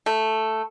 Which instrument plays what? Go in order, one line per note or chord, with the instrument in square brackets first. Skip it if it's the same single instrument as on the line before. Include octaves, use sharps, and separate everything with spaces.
[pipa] A3